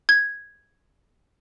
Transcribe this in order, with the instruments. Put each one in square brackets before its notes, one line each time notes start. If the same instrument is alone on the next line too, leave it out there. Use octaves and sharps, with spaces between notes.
[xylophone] G#6